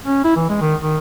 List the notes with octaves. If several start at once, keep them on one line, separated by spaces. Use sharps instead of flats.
C#4
E4
E3
G#3
D#3
D#3